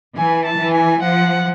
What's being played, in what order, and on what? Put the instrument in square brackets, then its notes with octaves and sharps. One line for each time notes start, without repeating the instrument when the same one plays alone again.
[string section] E3 [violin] G#5
[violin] A5
[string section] E3
[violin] G#5
[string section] F3 [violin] F#5